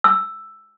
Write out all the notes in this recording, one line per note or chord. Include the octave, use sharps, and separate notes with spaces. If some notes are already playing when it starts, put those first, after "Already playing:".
E6